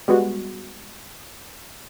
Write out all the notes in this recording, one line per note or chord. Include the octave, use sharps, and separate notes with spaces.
G3 G#3 B3 F#4